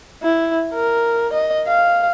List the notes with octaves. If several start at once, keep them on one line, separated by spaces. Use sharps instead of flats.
E4
A#4
D#5
F5